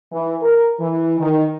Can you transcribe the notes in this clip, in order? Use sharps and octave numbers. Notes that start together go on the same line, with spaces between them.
E3
A#4
E3
D#3